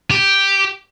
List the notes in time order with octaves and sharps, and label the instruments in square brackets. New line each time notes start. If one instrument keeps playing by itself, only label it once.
[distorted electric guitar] G4